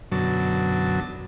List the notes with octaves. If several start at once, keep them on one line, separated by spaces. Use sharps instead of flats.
F#2 B2 D3 F#3 A5